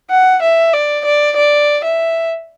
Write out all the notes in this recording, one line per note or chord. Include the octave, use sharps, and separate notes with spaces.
F#5
E5
D5
D5
D5
E5